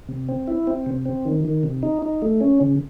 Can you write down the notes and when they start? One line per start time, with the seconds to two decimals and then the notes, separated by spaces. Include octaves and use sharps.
0.09 C3
0.28 C4
0.48 E4
0.67 C4
0.86 C3
1.05 C4
1.25 D#3
1.45 D#3
1.63 C3
1.83 D#4
2.02 D#4
2.22 A3
2.41 C#4
2.61 C#3